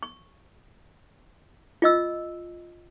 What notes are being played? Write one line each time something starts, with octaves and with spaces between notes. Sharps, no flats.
C#6
F4 D#5 E6